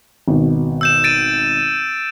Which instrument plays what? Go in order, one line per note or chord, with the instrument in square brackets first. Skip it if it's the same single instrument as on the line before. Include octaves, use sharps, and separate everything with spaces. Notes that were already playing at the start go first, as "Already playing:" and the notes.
[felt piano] G#1 B2
[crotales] E6 G6 E7
A6 D7 D#7